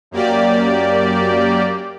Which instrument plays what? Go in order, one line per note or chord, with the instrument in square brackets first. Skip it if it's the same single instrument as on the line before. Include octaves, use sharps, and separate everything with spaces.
[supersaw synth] F#2 A#3 G4 D5